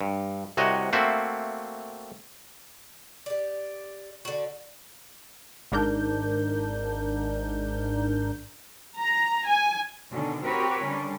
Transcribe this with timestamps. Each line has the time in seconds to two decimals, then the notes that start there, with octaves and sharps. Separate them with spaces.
0.01 G2
0.57 C2 C3 F#4 C#5 D#5
0.93 A3 A#3 C4 F#4 E5
3.26 G4 D5
4.25 D3 F#4
5.72 G#1 G#2 D4 A#4 G6
9.01 A#5
9.48 G#5
10.11 B2 D3 D#3 C#4
10.44 C4 F#4 G4 A#4 B4 C#5
10.85 D3 G3 C#4